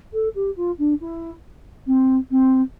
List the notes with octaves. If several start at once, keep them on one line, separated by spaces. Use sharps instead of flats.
A4
G4
F4
D4
E4
C4
C4